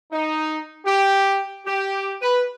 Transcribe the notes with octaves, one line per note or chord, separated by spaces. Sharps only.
D#4
G4
G4
B4